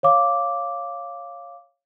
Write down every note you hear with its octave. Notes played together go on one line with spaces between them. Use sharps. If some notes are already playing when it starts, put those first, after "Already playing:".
C#5 F5 D6